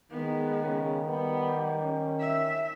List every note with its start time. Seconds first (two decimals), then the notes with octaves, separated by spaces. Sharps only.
0.11 D#3 G#3 B3
0.63 C#3
1.08 G3 B3
1.80 C#4
2.20 E5